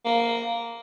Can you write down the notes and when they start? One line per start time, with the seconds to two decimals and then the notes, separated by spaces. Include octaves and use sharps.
0.05 A#3